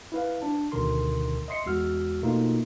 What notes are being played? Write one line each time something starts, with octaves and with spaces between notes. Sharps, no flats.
E4 B4 F5
D4 A5
D2 B2 D3 D#3 A#4 C6
D#5 E5 C6 C7 C#7
E2 G#3 F#4 E6 F6
B2 A3 A#3 D#4 F4